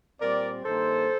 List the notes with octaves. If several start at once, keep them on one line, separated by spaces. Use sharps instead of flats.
A#2 G3 C4 A#4 D5
G2 D#3 A#3 A4 C5